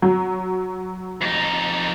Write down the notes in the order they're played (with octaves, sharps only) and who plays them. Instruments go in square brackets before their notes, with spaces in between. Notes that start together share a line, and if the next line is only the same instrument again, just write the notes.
[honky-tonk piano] F#3
[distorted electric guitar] F2 D#4